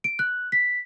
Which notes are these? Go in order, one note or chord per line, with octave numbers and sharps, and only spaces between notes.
D7
F#6
B6